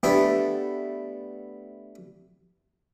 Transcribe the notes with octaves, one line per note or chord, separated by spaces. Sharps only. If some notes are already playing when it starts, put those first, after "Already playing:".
A3 B3 D4 E4 G4